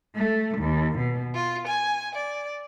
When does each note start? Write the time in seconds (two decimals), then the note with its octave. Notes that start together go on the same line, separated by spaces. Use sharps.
0.16 A3
0.58 D#2
0.98 B2
1.34 F4
1.68 G#5
2.15 D5